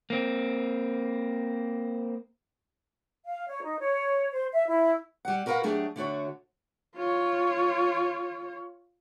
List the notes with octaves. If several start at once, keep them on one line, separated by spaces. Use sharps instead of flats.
A#3 C4
F5
C#5
D#4
C#5
C5
E5
E4
G3 F#5
F#4 A#4 B4 D5 F5 F#5
F#3 A3 D4 G4 G#4
D3 A3 F#4 C#5
F4 C#5